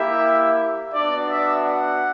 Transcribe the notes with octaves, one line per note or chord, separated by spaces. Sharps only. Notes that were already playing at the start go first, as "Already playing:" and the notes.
Already playing: A#3 E4 G4 E5
B3 D4 F#4 D5
E5
F#5